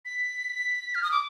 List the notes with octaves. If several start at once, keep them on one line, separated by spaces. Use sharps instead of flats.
B6
F6
D#6
D6